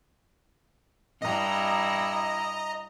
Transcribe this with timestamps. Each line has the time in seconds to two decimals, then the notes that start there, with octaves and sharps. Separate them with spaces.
1.22 G2 E4 D#5 A#5